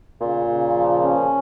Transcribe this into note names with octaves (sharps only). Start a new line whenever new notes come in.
A#2 C#3
C#3
F3
C#4